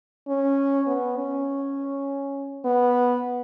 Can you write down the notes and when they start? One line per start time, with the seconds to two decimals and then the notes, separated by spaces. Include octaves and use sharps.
0.28 C#4
0.87 B3
1.16 C#4
2.64 B3